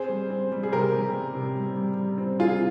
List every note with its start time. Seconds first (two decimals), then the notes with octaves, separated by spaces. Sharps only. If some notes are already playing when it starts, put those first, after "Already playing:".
Already playing: C4 G#4 C5
0.09 G3
0.30 C4
0.52 G3
0.63 G#4
0.72 C3 G4 A#4
0.94 G3
1.14 G3
1.35 C3
1.55 G3
1.76 G3
1.97 G3
2.18 C4
2.39 C4 F4 G#4